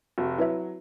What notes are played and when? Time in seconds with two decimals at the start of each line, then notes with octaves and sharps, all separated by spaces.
0.18 F1 F#4
0.38 F#3 E4 B4 E5